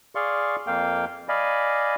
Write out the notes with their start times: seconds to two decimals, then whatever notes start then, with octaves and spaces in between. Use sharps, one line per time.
0.15 G#4 D5 F5 C6 C#6
0.67 F2 A#3 F5 G5
1.29 D5 D#5 F5 G#5 B5